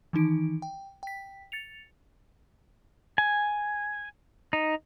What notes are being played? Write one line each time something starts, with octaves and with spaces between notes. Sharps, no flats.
D#3 E3 D#4 D7
G5
G5 B6
A6 C#7 F7
G#5
D#4